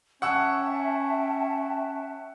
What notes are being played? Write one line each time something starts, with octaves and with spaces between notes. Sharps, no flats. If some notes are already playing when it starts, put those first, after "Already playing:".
C#4 E5 F#5 G5 A5 C#6 E6